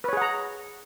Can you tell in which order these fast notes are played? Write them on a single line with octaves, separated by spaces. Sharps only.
B4 C#5 G#4 F#5 A#5